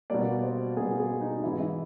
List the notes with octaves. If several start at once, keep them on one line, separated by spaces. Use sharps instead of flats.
B2 G3 A#3 D5
C5
B2 G3 A#3 G#4
G#4
D#4
G#2 E3 G#3 E4
E4